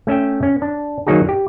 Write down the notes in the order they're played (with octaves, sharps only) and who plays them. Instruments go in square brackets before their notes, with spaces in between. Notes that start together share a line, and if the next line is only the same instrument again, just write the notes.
[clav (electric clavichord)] A3 C#4 E5 G5
C#4
D4
D#3 F#3 A#3 D#4 F#4 G#4
G4